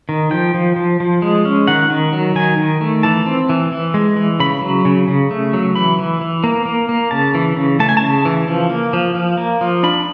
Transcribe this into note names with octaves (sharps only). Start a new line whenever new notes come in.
D#3
F3 G5
F3
F3
F3
G#3
C#4
D#3 F#5
D#3
F#3
D#3 G#5
D#3
A3
E3 A5
C4
E3
E3
G#3
E3
C#3 B5
F#3
C#3
C#3
A3
F#3
E3 B5
E3
E3
A#3
A#3
A#3
C#3 A5
E3
C#3
A3 A5
G#5
C#3 A5
E3
F3
A#3
F3
F3
A#3
F3
D4 B5